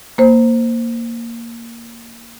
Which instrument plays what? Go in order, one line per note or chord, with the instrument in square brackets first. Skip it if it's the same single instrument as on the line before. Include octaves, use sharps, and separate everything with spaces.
[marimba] A#3 C5